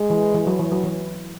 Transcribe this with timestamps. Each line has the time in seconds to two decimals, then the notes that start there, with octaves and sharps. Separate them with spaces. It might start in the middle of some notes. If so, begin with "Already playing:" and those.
Already playing: G#3
0.10 E3
0.34 E3
0.47 F#3
0.59 E3
0.72 F#3
0.84 E3